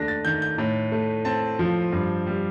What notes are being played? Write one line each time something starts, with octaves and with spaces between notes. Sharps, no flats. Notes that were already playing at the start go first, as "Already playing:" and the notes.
Already playing: D#2 A3 D4 A#6
A6
D#3 G6
G6
A2
A3
C4 A5
F3
G2
G3